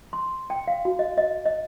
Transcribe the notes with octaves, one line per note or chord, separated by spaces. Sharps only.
C6
G5
F5
F#4
D#5
D#5
D#5